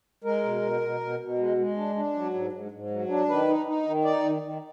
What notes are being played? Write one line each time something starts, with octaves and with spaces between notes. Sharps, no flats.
G#3 A#4
B2
B2
B2
B2
B2
G#3
G#3
D4
D4
F#3
G#2
G#2
G#2
F#3
D4
D#3 B4
D#4
D#4
D#3
D#4 D5
D#3
D#3